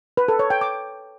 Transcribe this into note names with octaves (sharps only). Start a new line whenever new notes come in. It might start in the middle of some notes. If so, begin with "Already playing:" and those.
B4
A4
C#5
G5
D6